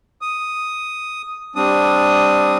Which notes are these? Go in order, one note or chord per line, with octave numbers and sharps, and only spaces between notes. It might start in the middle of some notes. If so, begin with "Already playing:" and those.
D#6
G3 C4 D4 D#6